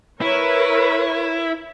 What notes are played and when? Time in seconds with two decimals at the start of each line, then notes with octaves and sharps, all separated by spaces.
0.22 E4 A#4 B4 C#5